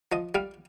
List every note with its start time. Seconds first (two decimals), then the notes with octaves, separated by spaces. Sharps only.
0.12 F3 D#5
0.35 G3 F5